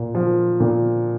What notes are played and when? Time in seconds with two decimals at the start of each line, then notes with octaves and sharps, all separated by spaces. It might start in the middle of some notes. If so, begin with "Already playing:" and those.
Already playing: A#2
0.15 F3
0.60 A#2